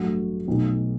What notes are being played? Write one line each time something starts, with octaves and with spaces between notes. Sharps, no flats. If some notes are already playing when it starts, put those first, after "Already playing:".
Already playing: A1 G2 F#3 A3 F#5
B1 B2 A3